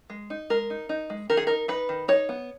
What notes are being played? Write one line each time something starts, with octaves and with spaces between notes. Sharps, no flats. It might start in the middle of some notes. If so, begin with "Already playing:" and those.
G#3
D#4
G#3 A#4
D#4
D#4
G#3
D#3 A#4
G#4
D#4 A#4
D#4 B4
D#3
D#4 C#5
B3